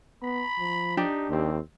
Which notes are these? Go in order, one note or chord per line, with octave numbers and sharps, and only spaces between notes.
B3 B5
F3
D4 D#4 G4 G5
D#2 C4